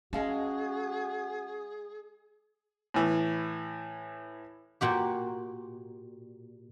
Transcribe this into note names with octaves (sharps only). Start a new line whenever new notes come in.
G#3 C#4 F#4 G#4 F5 A5
A2 E3
A#2 F#4 G4